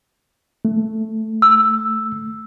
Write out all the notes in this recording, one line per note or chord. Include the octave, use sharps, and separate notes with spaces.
A3
E6